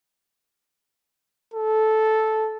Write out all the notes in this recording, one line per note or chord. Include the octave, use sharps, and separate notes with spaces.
A4